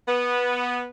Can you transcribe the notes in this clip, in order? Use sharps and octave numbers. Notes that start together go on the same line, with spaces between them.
B3